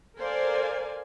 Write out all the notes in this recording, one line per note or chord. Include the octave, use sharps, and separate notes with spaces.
A4 A#4 C5 D5 F5 G#5